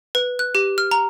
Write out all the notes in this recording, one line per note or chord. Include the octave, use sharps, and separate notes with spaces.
B4
F#6
G4
F6
A#5